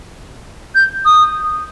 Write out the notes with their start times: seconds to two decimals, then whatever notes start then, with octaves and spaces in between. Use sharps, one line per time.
0.75 G6
1.05 D#6